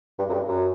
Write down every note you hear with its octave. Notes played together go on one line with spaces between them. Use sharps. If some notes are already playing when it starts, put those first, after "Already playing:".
G2
F#2
G2
F#2